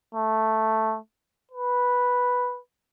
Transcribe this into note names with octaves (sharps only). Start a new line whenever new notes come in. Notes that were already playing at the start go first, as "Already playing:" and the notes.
A3
B4